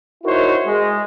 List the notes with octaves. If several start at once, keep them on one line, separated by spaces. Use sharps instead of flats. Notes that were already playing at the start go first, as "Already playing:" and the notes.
D#4 E4 F#4 A#4 C5 C#5
G#3